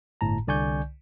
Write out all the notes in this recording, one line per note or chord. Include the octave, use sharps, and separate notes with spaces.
G1 A2 A5 A#5
C2 D3 D5 G#5 C#6 G6